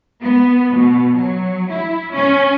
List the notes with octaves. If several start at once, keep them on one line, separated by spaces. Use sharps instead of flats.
B3
B2
F#3
E4
C#4